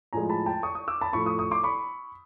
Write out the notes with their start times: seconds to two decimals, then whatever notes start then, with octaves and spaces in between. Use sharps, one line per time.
0.13 A2 F3 G#3 G#5 A#5
0.29 A5 B5
0.46 G5 A5
0.63 C#6 D#6
0.75 C#6 D#6
0.88 D6 E6
1.01 A5 B5
1.13 A2 F3 A3 B5 C#6
1.26 C#6 D#6
1.39 C#6 D#6
1.51 C6 D6
1.63 B5 C#6